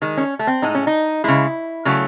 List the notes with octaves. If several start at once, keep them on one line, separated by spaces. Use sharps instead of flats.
D#3 G#3
C#4
A3
C4
A2 G#3 D#4
C#4
D#4
C#3 G#3 E4
C#3 F#3 A3